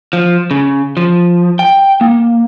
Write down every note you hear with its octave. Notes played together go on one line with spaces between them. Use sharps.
F3
C#3
F3
G5
A#3